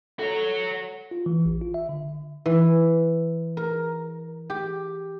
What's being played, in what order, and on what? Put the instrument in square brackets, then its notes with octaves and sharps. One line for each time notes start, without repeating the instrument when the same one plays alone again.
[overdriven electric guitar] F#4 C#5 [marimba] A4
[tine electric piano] F4
E3
A1
F4
E5
D3
[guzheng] E3
A#4
G4